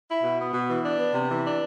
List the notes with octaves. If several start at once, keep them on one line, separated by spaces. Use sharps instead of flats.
E4
B2
B3
B2
E3
D4
B3
C3
E3
D4